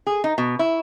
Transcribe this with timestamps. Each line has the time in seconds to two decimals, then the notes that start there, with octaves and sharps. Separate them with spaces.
0.07 G#4
0.24 D#4
0.38 B2
0.59 E4